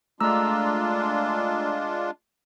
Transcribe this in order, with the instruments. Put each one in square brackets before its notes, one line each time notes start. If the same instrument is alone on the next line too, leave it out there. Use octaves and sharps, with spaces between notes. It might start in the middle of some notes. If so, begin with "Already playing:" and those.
[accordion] G#3 D4 F4 [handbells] A3 A#5 E6